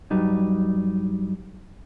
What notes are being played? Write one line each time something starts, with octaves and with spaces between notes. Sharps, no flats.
G2 F#3 G3 D#4